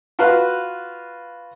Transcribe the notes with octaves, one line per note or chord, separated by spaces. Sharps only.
F4 F#4 B4 F5